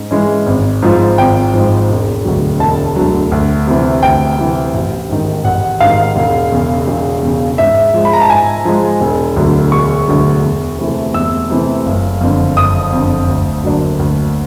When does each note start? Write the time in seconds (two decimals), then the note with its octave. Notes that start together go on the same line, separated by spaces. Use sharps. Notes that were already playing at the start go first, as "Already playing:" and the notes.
Already playing: G#2 C#4
0.11 E3 G#3 C#4
0.46 G#1
0.82 G#2 F3
1.18 G#1 G5
1.54 G#2 F3
1.89 E1
2.25 D2 D3 F#3
2.60 E1 A5
2.96 D2 D3 F#3
3.32 D2
3.67 C3 E3
4.02 D2 G5
4.38 C3 E3
4.74 A1
5.09 G#2 D#3
5.45 A1 F#5
5.80 G#2 D#3 F5
6.16 E1
6.52 E2 C#3
6.88 E1
7.23 E2 C#3
7.58 G#2 E5
7.94 F3 G#3
8.05 B5
8.13 A#5
8.21 A5
8.30 G#2 G#5
8.65 F3 G#3
9.01 E1
9.36 D2 D3 F#3
9.72 E1 C#6
10.08 D2 D3 F#3
10.43 E2
10.78 C3 E3 A3
11.14 E2 E6
11.50 C3 E3 A3
11.86 F#1
12.21 F2 D3
12.57 F#1 D#6
12.93 F2 D3
13.28 D2
13.63 D3 F#3 A#3 D4
13.99 D2